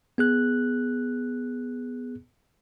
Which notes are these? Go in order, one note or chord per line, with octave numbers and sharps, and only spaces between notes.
B3 G#4 F#6